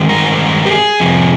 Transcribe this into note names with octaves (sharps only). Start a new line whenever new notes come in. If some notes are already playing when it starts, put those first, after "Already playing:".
Already playing: G2 D#3 G#3
A#4
G4
G#4
F2 C3 F3